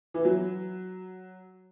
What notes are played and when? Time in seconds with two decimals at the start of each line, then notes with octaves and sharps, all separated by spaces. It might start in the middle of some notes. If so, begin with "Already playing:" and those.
0.14 E3
0.25 F#3